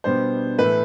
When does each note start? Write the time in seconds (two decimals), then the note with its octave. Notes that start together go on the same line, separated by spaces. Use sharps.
0.04 B2 G3 B3 D4 C5
0.59 A2 E3 A3 B4